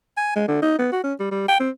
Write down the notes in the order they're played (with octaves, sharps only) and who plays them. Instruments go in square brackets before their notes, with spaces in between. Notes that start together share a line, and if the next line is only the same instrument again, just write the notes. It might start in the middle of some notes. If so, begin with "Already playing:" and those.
[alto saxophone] G#5
G#3
D3
D#4
B3
F#4
C#4
G3
G3
G5
C4